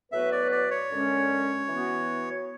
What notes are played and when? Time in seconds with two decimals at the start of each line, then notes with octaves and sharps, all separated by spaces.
0.12 A2 F#3 B3 F#4 B4 E5
0.32 D5
0.52 D5
0.71 C#5
0.90 F#2 D3 G#3 C#4
1.69 E3 B3 F#4